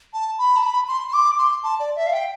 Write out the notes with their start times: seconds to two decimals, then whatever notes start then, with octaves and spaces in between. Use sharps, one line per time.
0.13 A5
0.38 B5
0.56 A5
0.63 B5
0.88 C6
1.08 C6
1.13 D6
1.38 C6
1.63 A5
1.79 D5
1.96 E5
2.06 F5
2.13 G5